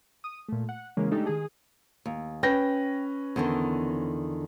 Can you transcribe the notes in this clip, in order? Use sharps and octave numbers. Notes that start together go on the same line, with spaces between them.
D#6
A#2 A3
F#5
C#3 E3 G#3 A#3 C#4
G#3 A3 D4 D#4 G4 A4
D#3 G#4
D#2
C#4 B4 G5 A#6
E2 D3 D#3